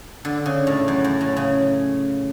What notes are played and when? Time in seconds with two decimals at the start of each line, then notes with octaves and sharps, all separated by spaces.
0.25 D3
0.46 C#3
0.67 A2
0.88 F#2
1.04 F#2
1.21 A2
1.37 C#3